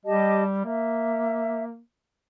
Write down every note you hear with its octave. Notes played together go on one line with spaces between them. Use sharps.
G3 G4 D#5 A5
A#3 E5